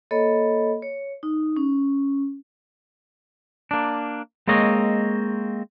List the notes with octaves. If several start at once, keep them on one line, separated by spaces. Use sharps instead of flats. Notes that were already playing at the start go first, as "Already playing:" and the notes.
A#3 A4 C#5 D#5 B5
C#5
D#4
C#4
A#3 D4
G#3 A#3 C4 C#5 D#5